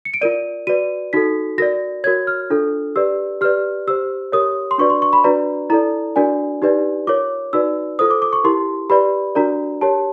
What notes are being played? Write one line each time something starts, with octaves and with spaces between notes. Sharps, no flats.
C#7
D7
F4 A#4 D5 D#7
F#4 B4 D5 D#7
D#4 F#4 A4 B6
F#4 A#4 D5 A#6
F#4 A#4 C#5 G#6
F6
D4 F4 A4
G4 B4 D5 E6
G4 B4 D5 F6
G4 C5 E6
G4 A#4 C#5 D#6
C6
D4 F#4 B4 D5 C#6
C6
C#6
B5
D4 F#4 B4 D5 A#5
E4 A4 D5 A#5
D4 F#4 A#4 D5 G#5
D#4 G4 B4 D5
F4 A#4 C#5 D6
D#4 F#4 B4 D5 E6
F4 A4 C5 D#6
D6
D6
C#6
E4 G4 A#4 C6
G4 B4 D5 B5
D4 F#4 A#4 D5 A#5
G4 A#4 C#5 A5